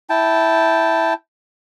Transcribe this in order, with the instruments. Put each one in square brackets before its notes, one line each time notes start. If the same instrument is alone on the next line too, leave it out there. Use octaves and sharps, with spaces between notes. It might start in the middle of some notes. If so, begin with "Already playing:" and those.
[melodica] E4 G5 A5